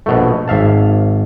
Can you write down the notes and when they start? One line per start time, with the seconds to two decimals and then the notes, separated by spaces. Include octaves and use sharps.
0.06 A#1 B2 A3
0.48 G#1 E5 F5 A5